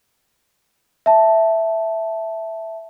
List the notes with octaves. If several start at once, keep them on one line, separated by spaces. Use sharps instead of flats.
E5 A5